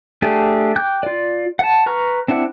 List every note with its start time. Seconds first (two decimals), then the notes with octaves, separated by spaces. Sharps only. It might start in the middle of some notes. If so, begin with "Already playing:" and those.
0.22 A3 D4 G4 G#4
0.76 G5 D6 F#6 G6
1.03 F4 D5
1.59 F#5 A5
1.86 B4 A#5 C#6 F6
2.28 C4 D4 E4 F#5